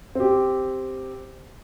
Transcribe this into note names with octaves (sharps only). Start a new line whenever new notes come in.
C4 G4